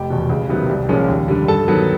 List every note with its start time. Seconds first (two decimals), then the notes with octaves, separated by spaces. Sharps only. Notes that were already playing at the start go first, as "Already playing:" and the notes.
Already playing: F1 G4 G5
0.10 E2 B2
0.29 C#2
0.49 C3 D#3 F#3 B3
0.69 C2
0.89 A#2 F3 G#3 C#4
1.08 D#2
1.28 D3 G3
1.48 G2 A4 A5
1.68 D#3 F#3 B3